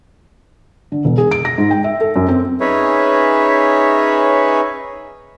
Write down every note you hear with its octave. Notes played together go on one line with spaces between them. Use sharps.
D3
E1
G#4
D7
A#6
G#2
G5
E5
A4
F#2
C4
C#4 D#4 G#4 B4 C#5 E5